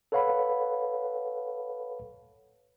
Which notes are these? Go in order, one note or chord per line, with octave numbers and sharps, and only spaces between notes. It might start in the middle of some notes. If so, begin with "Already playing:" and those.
A4 B4 C#5 F5 F#5 B5